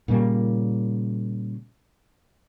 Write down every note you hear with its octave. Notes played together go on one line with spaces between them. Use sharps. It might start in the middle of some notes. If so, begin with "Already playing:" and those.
A#2 C#3 G3 A#3